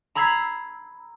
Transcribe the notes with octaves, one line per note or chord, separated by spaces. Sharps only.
A#5 B5 E6 G#6 B6 C7